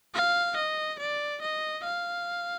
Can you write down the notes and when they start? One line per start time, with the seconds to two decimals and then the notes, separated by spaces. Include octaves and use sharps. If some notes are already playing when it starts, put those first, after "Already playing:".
0.14 F5
0.57 D#5
0.99 D5
1.41 D#5
1.83 F5